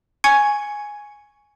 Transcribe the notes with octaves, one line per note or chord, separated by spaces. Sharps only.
G#5 C#6 G#6 C#7